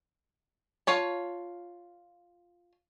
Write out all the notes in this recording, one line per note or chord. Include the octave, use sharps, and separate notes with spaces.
F4 C#5 A5